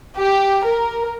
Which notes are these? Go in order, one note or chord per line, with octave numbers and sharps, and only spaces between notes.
G4
A#4